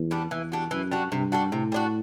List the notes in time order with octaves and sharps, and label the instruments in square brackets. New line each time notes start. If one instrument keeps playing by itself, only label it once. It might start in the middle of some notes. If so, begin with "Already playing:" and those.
Already playing: [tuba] E2
[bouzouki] G3 B3 D4
[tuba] E2 [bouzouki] E3
[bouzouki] G3 D4 F#4
[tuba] F#2 [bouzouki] E3
[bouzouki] G3 D4 F#4
[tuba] G2 [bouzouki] C3
[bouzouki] G3 D4 F#4
[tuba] A2 [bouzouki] C3
[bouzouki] G3 D4 F#4